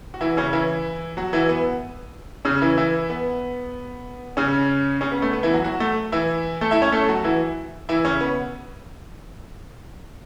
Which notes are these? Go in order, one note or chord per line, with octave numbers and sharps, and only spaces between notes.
F#4
E3 E4
C#3 C#4
E3 E4
F#3 F#4
E3 E4
B3
C#3 C#4
E3 E4
E3 E4
B3
C#3 C#4
C#3 C#4
B3
A3
B3
E3 E4
F#3 F#4
F#3 F#4
A3
E3 E4
A3 A4
E4 E5
C#4 C#5
A3 A4
F#3 F#4
E3 E4
E3 E4
C#3 C#4
B3